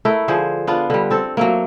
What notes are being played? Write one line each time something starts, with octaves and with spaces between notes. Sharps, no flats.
A3 E4 A#4
D3 F3 G#4 C5
B3 D4 F4
D3 G3
C4 A4
F#3 A3 A#3